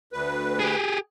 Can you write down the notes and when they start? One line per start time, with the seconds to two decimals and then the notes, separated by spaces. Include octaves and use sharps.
0.13 D2 B4
0.60 G4 G#4